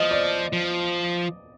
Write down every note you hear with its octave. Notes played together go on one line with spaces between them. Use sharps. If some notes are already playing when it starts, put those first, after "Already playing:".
Already playing: F3 D#5
D5
F3